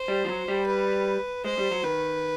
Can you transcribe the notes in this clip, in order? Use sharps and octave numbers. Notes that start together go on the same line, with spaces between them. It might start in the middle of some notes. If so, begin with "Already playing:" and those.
Already playing: C5
G3
F3
F#3
G3
B4
G#3 C5
G3
F#3
D#3 B4